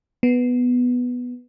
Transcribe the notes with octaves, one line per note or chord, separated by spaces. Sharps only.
B3